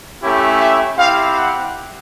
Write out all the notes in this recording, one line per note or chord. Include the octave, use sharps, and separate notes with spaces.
A3 C#4 E4 G4
E5
C4 E4 G4 F5
F#5